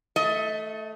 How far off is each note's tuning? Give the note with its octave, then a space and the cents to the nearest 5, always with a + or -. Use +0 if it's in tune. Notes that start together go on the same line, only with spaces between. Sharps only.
A3 +0 D#5 +35